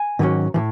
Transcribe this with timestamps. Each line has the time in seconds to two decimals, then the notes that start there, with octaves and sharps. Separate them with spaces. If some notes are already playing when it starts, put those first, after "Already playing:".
Already playing: G#5
0.19 G#2 D#3 F#3 C#4
0.54 A2 E3